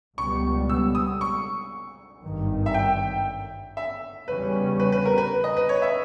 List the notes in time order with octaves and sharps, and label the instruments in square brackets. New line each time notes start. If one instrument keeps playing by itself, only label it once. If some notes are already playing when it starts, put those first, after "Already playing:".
[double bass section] C#2 B2 G3 B3 [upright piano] C#6
[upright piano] E6
D#6
C#6
[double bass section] G#1 G2 D#3
[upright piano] E5
G5
E5
[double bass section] E2 C#3 G3 C#4 [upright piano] B4
[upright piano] B4
B4
A#4
B4
D#5
B4
C#5
E5